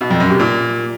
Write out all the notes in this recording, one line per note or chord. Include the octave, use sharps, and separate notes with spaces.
B2
F2
F#2
C3
A#2